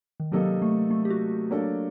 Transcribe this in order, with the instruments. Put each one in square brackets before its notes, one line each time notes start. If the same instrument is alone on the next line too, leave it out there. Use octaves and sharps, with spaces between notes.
[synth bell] D#3
[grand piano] C3 G3 A#3 D#4 A4 [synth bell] F#3
[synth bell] A3
A3
G4
F#4
[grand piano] F#3 A#3 D4 A4